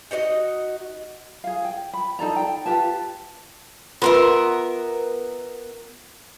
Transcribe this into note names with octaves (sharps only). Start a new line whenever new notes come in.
D#4 F#4 C#5 D#5
G#4 F5
G5
B5
D#4 A4 D5 A#5
G5
F4 G4 B4 A5
B3 F4 A#4 B4 E5 C6